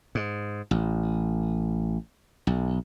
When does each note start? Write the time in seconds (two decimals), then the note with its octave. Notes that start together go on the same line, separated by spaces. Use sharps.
0.15 G#2
0.71 A1
2.47 B1